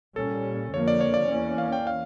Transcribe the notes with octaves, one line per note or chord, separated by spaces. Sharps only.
A#2 G3 C#4 A4
F2 D3 F3 A#3 C#5
D5
C#5
D5
E2 E3 A#3 C#4
F5
G5
F5